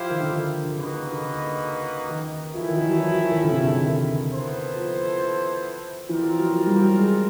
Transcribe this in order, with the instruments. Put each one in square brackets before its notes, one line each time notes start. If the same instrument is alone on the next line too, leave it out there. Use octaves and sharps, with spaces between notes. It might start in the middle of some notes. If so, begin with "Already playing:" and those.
Already playing: [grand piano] F3 [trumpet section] E4 G4 C5 F5
[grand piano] D#3
D3
D3
D3
[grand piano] C#3 [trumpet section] A#3 D#4 F#4 B4 D#5
[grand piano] D3
C#3
D#3
[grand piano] F3 [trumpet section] A3 C#4 E4
[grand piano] E3
D#3
E3
F#3
F3
F#3
F3
D#3
D3
C3
C#3
D3
D#3
D#3
[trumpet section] B3 E4 A4 C5
[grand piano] F3
[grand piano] E3 [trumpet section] C4 F4 A#4 D5
[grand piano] F3
F#3
F#3
G3
F#3
G#3